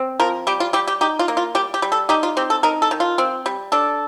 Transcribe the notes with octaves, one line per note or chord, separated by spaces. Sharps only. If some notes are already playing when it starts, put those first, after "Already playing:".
Already playing: C4
F3 A#4
G3 G4
F4
G3 G4
G4
D#4 G4
F4
A#3
F4
G3 G4
G4
G3
A4
D#4 G4
F4
C4 G4
A4
D#4 A#4
A4
D#3
F4
C4
G3
D4 A4